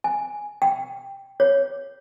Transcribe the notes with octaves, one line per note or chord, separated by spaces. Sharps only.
G#5
G5
C#5